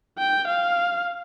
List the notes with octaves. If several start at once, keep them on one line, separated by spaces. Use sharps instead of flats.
G5
F5